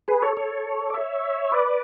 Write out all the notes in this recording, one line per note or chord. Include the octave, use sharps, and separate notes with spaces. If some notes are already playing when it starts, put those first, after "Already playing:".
G#4 B4
A4 C#5
A4 C#5
D5
C#5 E5
B4 D5